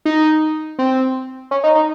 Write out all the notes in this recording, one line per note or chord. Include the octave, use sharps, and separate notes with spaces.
D#4
C4
C#4
D#4
D#4